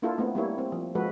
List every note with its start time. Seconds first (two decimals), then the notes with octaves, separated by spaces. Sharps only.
0.02 A#3 D4 E4 F4 A4
0.18 A3 B3 C4
0.35 G3 A#3 E4 C#5
0.58 C4
0.72 F3
0.95 F3 G#3 F#4 A4 B4